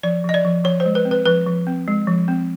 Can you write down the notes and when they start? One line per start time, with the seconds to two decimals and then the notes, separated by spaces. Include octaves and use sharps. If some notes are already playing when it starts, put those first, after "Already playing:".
0.03 F3 D5
0.24 F3 D#5
0.34 D5
0.45 F3
0.64 F3 C#5
0.80 C5
0.86 G#3
0.95 B4
1.05 C4
1.11 B4
1.25 F3 B4
1.47 F3
1.67 C4
1.88 G#3
2.08 F3
2.28 C4